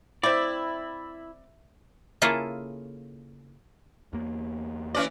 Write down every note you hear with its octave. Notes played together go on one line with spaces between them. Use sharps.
C4 E4 D5 G5
C#3 A#3 E4 F4 G#4 A4
E2 A#3
E3 C#4 D5